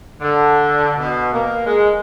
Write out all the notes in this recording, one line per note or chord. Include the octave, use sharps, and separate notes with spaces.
D3
B2
A#3
G#3